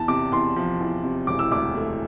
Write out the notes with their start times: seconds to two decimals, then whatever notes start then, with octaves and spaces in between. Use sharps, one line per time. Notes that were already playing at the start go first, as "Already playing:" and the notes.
Already playing: E2 A5
0.08 C3 D6
0.32 E2 C6
0.56 F3
0.80 E2
1.03 C3
1.27 E1 D6
1.39 E6
1.51 D2 D6
1.75 A3